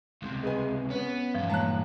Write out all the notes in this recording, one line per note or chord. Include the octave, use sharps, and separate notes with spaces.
C#2 C3
G#3 B4 G#5
B3 C#4 B4
G2 A#2 E3 F3
G#3 A#3 C#5 A5 F#6